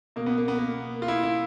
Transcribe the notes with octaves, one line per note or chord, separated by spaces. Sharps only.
B2 A#3
B3
A#3
B3
A#3
F4
E4
E4